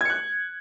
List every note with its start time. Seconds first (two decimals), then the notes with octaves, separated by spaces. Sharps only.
0.01 G#6
0.05 C#7
0.10 F#6